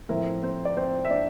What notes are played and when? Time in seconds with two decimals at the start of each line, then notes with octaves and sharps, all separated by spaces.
0.09 A2 F3 C4 E4 A#4
0.43 C4 C5
0.65 D5
0.77 C4 C5
1.05 E5
1.11 D4 D5